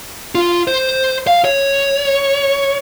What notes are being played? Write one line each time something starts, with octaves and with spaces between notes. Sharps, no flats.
F4
C5
F5
C#5